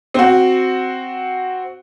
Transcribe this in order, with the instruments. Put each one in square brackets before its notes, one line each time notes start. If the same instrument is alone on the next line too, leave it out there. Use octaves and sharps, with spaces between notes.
[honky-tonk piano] C4 F#4